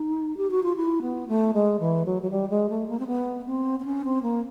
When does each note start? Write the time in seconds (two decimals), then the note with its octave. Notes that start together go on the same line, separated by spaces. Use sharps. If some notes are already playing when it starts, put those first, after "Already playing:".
Already playing: D#4
0.37 G4
0.51 F#4
0.63 F4
0.76 E4
1.02 B3
1.28 A3
1.54 G#3
1.80 E3
2.06 F#3
2.22 F#3
2.31 G3
2.50 G#3
2.69 A3
2.88 A#3
3.00 C4
3.07 B3
3.47 C4
3.80 C4
3.85 C#4
4.05 C4
4.23 A#3